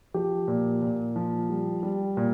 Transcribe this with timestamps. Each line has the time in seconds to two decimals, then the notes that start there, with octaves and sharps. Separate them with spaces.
0.14 F3 G4
0.48 A#2
0.82 A#2
1.16 F3
1.50 G3
1.83 G3
2.17 A#2